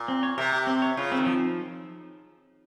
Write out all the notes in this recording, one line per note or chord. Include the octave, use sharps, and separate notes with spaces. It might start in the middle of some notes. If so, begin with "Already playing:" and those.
Already playing: A#2
C4
C#5
C3 A#4
G4
C4
C#5
C#3 F4
C4
D#3
F3